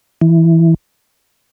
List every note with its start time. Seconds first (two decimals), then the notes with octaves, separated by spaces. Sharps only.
0.21 E3